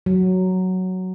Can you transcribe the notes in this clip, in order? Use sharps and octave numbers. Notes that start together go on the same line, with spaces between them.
F#3